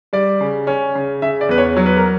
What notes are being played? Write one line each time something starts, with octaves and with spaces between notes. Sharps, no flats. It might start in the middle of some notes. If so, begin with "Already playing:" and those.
G3 D5
C#3
C#4
C#3
C#3 E5
D5
E2 B4
C#5
F#3 C#5
B4
A#4